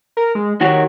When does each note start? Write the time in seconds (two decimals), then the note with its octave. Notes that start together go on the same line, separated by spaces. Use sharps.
0.17 A#4
0.35 G#3
0.61 D#3 F#4 G4 C#5